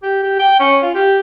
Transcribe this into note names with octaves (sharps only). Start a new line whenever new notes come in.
G4
G4
G5
C#4
F4
G4